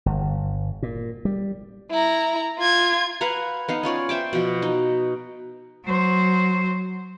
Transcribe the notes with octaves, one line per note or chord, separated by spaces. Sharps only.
G1
A#2
G3
E4 A#5
F4 G#6
B4 F5 F#5 A#5
B3 D#4 F5
C#4 F4 C#5 D5
C5 E5 G5 D6
B2 F3
D#4
F#3 C5